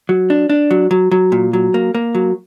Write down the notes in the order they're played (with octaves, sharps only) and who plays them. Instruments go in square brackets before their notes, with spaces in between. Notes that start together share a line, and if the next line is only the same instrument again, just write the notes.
[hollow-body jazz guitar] F#3
D4
D4
F#3
F#3
F#3
A#2
F#3
A#3
A#3
F#3